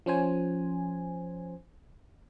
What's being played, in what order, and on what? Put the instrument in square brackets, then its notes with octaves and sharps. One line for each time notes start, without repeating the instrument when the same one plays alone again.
[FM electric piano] F3 C#4 C5 G#5